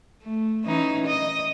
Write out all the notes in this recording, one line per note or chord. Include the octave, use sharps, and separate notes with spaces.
A3
E3 C#4 D#4
D#5